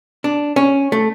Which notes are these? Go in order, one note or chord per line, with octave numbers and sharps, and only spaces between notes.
D4
C#4
A3